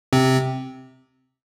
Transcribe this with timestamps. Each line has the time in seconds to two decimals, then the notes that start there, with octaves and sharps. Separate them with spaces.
0.13 C3 C4